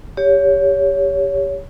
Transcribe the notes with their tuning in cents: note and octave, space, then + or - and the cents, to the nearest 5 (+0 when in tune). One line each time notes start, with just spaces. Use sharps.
G4 +15 C#5 +20